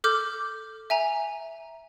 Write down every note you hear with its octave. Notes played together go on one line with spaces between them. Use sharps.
A4 D6 F6 G6
E5 G#5 A#5